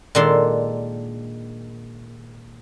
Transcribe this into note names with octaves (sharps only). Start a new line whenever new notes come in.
A#2 D#3 G#3 D4 A4 C6